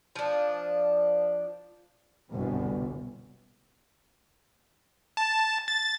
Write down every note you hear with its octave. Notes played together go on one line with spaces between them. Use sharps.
F3 D4
G1 C2 F#2 B2
A5
A6